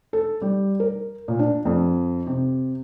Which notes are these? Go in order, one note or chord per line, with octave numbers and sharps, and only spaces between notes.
A4
G3
A#4
A#2
D4
F2
C3